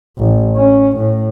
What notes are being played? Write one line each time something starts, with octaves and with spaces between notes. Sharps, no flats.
A1
C#4
A2